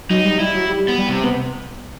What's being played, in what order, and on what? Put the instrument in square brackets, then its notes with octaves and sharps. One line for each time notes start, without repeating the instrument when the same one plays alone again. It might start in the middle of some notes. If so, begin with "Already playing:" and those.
[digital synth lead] F#3 [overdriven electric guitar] D#4
[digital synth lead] G3
[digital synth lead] G3 [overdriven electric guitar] E4
[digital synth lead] F#3
G3
[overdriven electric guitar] B3
[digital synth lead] G3
[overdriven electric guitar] C3
[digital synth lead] B3